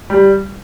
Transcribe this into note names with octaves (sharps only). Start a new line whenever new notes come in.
G3